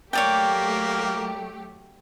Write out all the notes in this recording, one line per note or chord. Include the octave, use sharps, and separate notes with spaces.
F#3 A3 A#3 G4 C#5 D5 G5